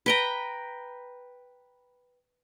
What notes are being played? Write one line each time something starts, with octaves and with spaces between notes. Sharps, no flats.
B4 G5 A#5